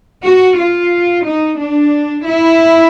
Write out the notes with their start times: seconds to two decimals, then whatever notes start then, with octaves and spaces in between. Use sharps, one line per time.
0.24 F#4
0.58 F4
1.25 D#4
1.59 D4
2.25 E4